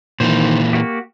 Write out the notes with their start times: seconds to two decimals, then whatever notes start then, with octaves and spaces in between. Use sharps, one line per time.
0.20 A#2 D#3 E3 C5
0.73 A#3 F#4 G4